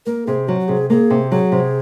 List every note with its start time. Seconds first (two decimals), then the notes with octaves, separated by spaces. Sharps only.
0.06 A#3 A#4
0.27 C3 G#4
0.48 F#3 F#4
0.60 F#4
0.68 C3 G#4
0.90 A#3 G#4
1.10 C3
1.31 F#3 G#4
1.52 C3